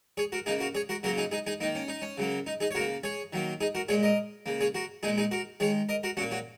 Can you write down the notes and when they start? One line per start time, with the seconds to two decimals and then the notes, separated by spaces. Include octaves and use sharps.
0.17 G#4 C#5
0.32 F#4 A#4
0.46 C#3 A#3 D#4 G#4
0.60 F#4 A#4
0.75 G#4 C#5
0.89 F#4 A#4
1.03 C#3 F#3 A#3 F#4 A#4
1.18 D#4 G#4
1.31 D#4 G#4
1.47 D#4 G#4
1.60 A#3 D#4
1.64 D#3
1.75 C#4
1.88 D#4
2.02 C#4
2.18 C#3 F#3 A#3
2.47 D#4
2.60 D#4 G#4
2.71 C#5
2.75 C#3 F#4 A#4
2.80 A#3
3.03 G#4 C#5
3.33 D#3 F#3 A#3
3.61 D#4 G#4
3.75 F#4 A#4
3.88 A#2 G#3 G#4 C#5
4.03 A#4 D#5
4.46 C#3 A#3
4.61 G#4 C#5
4.75 F#4 A#4
5.03 A#2 G#3 D#4 G#4
5.18 D#4 G#4
5.31 F#4 A#4
5.60 D#3 G#3 G#4 C#5
5.89 A#4 D#5
6.03 F#4 A#4
6.17 A#2 A#3 C#4 F#4
6.31 C#4 F#4